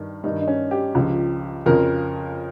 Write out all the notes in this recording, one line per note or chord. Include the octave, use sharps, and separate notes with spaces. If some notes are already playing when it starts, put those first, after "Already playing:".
Already playing: G2 D#3
G2 D#3 D#4
D#4
C#4
G4
C#2 C#3 F3
F2 C#3 F3 A#4